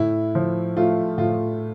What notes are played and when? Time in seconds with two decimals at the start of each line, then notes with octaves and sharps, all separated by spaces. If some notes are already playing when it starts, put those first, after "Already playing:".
Already playing: A2 E4
0.35 F3
0.76 A3 F4
1.18 A2 F4